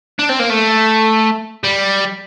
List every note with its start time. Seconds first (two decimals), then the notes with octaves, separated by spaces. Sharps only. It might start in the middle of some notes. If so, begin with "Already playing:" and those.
0.19 D4
0.30 C4
0.40 A#3
0.50 A3
1.64 G3